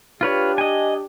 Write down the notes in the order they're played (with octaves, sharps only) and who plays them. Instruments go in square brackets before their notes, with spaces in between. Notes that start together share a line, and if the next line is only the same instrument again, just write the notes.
[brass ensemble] D4 G4 [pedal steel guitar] F4 B4 C#5
[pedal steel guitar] D#5 G#5